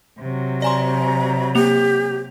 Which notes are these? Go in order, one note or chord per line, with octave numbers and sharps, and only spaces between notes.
C3 F#3
D5 G#5 A#5 C6
A#3 G4 F7